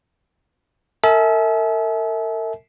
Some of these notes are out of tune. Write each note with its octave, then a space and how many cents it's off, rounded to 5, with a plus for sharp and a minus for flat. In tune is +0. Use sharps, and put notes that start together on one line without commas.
A#4 -45 E5 -30 G#5 +45